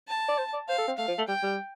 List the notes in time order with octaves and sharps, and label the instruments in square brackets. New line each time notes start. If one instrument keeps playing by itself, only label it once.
[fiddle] A5
[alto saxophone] D5
C5
D5
[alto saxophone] C5 [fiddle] F5
[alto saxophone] A4
C4
[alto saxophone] A3 [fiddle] F5
[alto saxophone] F3
A3
[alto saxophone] G3 [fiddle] G5
[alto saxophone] G3